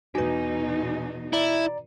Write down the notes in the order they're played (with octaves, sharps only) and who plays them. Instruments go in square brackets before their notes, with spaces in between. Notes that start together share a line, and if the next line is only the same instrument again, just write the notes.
[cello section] E2 B2 D#4 [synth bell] F#4 B4 [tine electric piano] G#5
[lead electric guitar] E4 [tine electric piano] D5 A#5